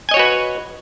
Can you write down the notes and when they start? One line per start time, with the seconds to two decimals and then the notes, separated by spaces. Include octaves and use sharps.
0.09 G#5
0.11 D#5
0.14 C#5
0.17 F#4
0.19 B4